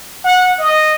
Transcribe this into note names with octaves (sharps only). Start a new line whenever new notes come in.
F#5
D#5